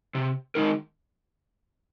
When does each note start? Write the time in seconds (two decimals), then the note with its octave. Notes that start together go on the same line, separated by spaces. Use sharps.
0.15 C3
0.55 D#3 G#3 D#4 A#4